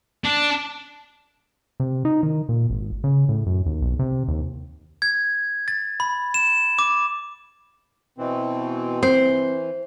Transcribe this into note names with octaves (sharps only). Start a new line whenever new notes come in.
D4
C3
D#4
D#3
A#2
G#1
C#3
A2
F#2
D#2
B1
C3
D#2
G#6
A6
B5
E7
D6
B2 E3 C4
E3 C4 C5